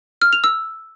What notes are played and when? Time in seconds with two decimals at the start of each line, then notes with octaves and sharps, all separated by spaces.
0.22 F6
0.33 F7
0.44 E6